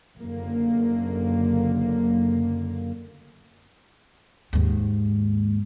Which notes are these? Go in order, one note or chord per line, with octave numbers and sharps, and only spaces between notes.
F#1 F#2 D3 A#3
D#2 G#2